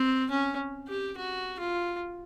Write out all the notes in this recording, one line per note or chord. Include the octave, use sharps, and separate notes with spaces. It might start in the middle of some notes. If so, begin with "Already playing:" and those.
Already playing: C4
C#4
G4
F#4
F4